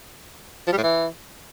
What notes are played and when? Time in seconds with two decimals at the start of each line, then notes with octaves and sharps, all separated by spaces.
0.67 F3
0.72 G3
0.78 A2
0.83 E3